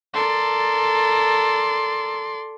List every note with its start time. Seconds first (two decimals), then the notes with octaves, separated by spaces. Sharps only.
0.14 A4 A#4 D5 C6